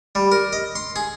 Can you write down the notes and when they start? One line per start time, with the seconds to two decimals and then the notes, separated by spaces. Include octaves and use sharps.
0.15 G3
0.32 A#4
0.53 D#5
0.75 C6
0.96 G#4